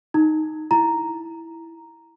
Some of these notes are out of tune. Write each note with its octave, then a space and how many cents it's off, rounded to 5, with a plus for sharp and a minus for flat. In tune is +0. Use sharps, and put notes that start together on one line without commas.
D#4 +0 A#5 -40
E4 +0 A#5 +0